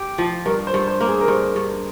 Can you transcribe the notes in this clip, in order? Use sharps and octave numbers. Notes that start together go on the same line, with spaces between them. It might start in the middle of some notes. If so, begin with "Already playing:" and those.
Already playing: G4
F3
G2 A#4
C5
G2
C5
A#3
G#4
A#4
G2 C5
G2